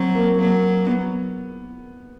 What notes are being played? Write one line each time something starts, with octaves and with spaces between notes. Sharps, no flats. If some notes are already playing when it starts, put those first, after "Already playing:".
Already playing: F#3 C4
A#3
F#3 A#3
B3